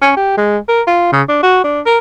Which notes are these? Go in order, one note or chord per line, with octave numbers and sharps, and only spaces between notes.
C#4
G4
G#3
A#4
F4
C#3
D4
F#4
D4
A#4